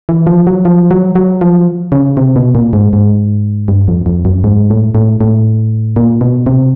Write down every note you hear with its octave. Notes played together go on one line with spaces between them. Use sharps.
E3
F3
F#3
F3
F#3
F#3
F3
C#3
C3
B2
A#2
G#2
G#2
G2
F2
F2
F#2
G#2
A2
A2
A2
A#2
B2
C3